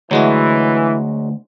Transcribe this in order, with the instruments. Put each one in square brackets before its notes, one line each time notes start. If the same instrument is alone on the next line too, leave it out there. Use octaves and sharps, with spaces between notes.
[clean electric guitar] D2 [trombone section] E3 [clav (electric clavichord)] F#3 G#3 F#4